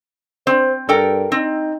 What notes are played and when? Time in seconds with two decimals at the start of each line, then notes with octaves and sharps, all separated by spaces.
0.47 C4 C5
0.89 G2 A4 A#4 G5
1.32 C4 D#4